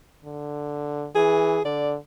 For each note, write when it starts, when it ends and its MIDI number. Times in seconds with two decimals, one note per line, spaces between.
0.25 1.08 50
1.15 1.59 52
1.15 1.63 68
1.65 1.97 50
1.65 1.94 74